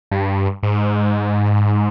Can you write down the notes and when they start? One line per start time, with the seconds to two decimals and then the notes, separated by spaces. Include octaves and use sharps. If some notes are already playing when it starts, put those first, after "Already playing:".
0.11 G2
0.63 G#2